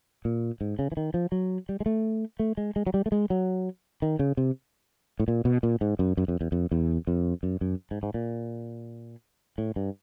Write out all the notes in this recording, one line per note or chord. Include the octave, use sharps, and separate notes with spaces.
A#2
G#2
C#3
E3
D#3
F3
F#3
G3
G#3
A3
A3
G#3
G#3
F#3
G3
A3
G#3
F#3
D#3
C#3
C3
A2
A#2
B2
A#2
G#2
F#2
F#2
F2
E2
F2
E2
F2
F#2
F#2
G#2
G#2
A#2
A2
G2